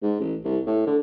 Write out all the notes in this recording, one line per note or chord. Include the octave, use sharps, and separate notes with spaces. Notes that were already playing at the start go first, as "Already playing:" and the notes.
G#2
A1
C2
A2
D3